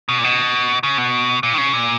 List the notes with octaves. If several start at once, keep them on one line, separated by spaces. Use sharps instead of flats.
B2
A#2
B2
C#3
B2
A#2
D#3
C#3
A#2